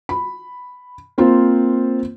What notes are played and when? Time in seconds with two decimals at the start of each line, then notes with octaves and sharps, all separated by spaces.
0.09 B5
1.18 A#3 C4 F4 C5